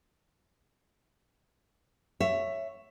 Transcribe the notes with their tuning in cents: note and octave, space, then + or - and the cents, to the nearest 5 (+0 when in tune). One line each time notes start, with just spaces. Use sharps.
C#5 -5 E5 +15